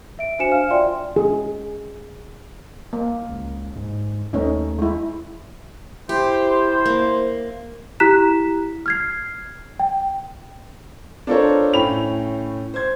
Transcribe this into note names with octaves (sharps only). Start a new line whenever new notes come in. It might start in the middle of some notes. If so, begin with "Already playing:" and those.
E5 D7
D4 F#4 C5 G#5 C#7 E7
F5 F6
F4 D5 E5 G5 C6
G#4
A#3
C#2
G#2
D#2 A3 C#4 D#4
G#3 E4
E4 G4 C5
A#3
E4 G4 A#5 F#6 B6 E7
F6 G#6 C7
G5
D4 F4 A4 A#4 C5 C#5
A2 C#4 G5 B5 F7
C5 G#6